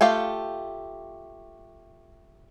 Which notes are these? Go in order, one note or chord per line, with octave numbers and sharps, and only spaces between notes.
A3 F4 G4 F5